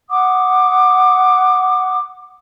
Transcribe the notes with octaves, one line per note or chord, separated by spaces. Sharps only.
F#5 D6 D#6